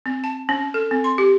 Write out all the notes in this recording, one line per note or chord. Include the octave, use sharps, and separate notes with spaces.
C4
A5
C#4
A4
C4
C6
G4